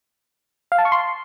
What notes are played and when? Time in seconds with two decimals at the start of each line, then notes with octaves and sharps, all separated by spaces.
0.72 F5
0.78 A5
0.85 C#6
0.92 C6